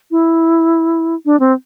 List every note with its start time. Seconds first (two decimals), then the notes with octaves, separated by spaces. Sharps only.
0.11 E4
1.25 D4
1.40 C4